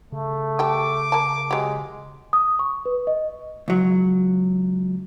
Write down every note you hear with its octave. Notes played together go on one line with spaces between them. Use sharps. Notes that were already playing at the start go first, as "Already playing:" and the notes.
C#3 A3
G3 G5 A5 D6
A#3 G#5 A5
F#3 G#3 G4
D#6
C#6
B4
D#5
C#2 F#3